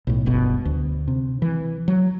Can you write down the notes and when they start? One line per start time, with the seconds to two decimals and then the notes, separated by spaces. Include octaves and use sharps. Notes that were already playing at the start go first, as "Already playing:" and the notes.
0.07 B1 A2
0.26 D1 G1 G2 B2
0.65 D2
1.08 C3
1.42 E3
1.88 F#3